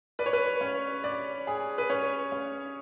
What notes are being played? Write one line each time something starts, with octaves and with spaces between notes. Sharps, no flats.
B4 D5
C#5
B4
C#4
D5
G#4
B4
C#4 C#5
C#4